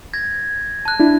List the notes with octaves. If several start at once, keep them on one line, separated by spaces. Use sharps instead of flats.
G#6 A#6
A5 F#6
D4 E4